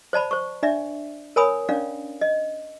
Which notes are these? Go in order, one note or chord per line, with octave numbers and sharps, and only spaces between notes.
C5 D5 A5 B5
C5 C#6
D4 D5 E5
A#4 C#5 G#5 B5 D#6
C#4 D4 D5 F5
D#5